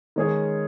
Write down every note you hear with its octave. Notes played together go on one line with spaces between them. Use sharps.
D#3 G#3 C#4 G#4 C#5